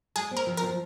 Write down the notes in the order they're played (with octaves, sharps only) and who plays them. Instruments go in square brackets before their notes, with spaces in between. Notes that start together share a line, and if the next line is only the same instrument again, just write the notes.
[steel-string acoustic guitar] G#3 [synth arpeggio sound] G#4
[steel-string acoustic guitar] C4
[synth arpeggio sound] A#4
[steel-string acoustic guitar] F3
[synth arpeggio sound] A#4
[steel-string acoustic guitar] F3